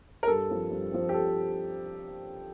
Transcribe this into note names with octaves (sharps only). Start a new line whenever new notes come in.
A#4
G2 A4
F3 C4
G2
F3 C4
G4
A4